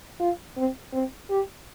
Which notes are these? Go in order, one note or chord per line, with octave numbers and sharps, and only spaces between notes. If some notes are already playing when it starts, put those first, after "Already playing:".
F4
C4
C4
G4